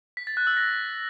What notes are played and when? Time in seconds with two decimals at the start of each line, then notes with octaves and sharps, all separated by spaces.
0.17 B6
0.27 A6
0.37 F#6
0.47 E6
0.57 A#6